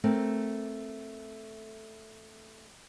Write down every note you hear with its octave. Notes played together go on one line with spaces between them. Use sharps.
A3 C4 A#4